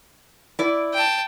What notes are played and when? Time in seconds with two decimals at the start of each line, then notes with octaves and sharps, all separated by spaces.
0.59 E4 D5
0.94 G5 A5